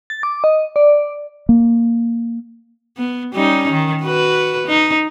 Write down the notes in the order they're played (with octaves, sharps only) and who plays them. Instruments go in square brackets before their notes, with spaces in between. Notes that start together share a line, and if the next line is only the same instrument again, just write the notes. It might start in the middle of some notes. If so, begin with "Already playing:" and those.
[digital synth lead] A6
D6
D#5
D5
[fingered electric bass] A#3
[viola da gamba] B3
G3 C#4 D#4
D#3
F#4 B4
D#4